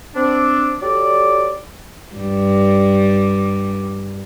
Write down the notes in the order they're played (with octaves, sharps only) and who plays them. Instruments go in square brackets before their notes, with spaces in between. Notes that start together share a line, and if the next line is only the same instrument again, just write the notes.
[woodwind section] C4 D4
F#3 G4 A4 D5
[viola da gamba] G2 G3